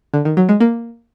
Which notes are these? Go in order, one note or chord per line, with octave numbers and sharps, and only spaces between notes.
D3
D#3
F#3
G#3
A#3